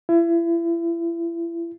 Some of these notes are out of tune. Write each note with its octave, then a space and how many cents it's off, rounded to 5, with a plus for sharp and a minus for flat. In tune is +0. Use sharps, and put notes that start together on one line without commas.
E4 +35